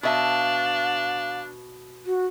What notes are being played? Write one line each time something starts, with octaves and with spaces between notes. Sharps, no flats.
B2 D4 E5 F5 A5
F#4